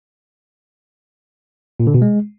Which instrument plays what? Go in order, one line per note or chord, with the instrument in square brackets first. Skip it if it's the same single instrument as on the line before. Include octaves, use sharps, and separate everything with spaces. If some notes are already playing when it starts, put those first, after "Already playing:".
[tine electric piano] A#2
D3
B2
G#3